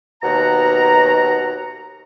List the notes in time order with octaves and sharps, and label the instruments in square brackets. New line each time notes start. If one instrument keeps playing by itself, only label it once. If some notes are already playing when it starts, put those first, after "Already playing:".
[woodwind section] D#2 B2 F#5 A#5